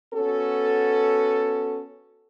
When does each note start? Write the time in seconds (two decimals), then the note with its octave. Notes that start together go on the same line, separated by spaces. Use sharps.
0.14 B3 C#4 F#4 A4